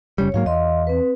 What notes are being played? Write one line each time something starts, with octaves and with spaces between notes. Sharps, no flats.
F#1 C#3 G3 C#5
G#2 F#3 A#3 F5
E2 D#5 F5 C6
C4 B4